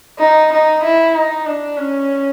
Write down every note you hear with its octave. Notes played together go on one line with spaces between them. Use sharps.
D#4
D#4
E4
D#4
D4
C#4